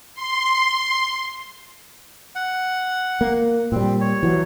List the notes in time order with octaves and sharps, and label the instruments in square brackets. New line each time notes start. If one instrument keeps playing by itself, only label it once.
[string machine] C6
[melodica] F#5
[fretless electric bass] A#3
[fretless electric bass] A#2 G3 [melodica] C4
[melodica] C#5
[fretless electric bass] E3 F#3